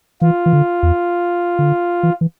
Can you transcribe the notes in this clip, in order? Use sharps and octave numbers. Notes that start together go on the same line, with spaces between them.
E3 F4
E3
D3
E2
D3
E3
E3